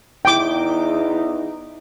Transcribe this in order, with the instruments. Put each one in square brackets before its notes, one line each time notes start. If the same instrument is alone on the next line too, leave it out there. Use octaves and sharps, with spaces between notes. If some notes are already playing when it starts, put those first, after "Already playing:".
[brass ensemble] E2 D#4 [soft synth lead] E4 [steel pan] G5 D6